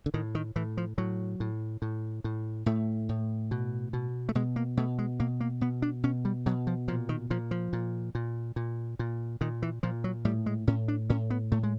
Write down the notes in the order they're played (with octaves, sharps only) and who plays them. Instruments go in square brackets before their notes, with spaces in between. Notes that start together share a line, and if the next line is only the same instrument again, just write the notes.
[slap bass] D3
A2 D#3
D#3
A2 E3
F3
A2 F#3
A2
A2
A2
A2 A3
A2
B2
B2
A3
B2 G#3
A#3
B2 A3
G#3
B2 A#3
A#3
B2 B3
D4
B2 C#4
G3
B2 F#3
F3
A#2 F3
D#3
A#2 F3
F3
A#2
A#2
A#2
A#2
A#2 D#3
E3
A#2 F3
F#3
A2 G3
G#3
A2 C#4
D4
A2 C#4
B3
A2 A3
G#3